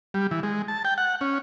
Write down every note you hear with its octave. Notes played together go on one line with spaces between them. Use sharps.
G3
E3
G#3
A5
G5
F#5
C#4